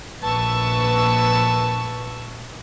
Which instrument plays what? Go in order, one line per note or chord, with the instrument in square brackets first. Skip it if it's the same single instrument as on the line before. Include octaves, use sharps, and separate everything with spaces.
[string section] A#1 B4 A5 C#6 E6